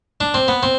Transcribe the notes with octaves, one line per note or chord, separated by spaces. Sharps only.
D4
C4
B3
C4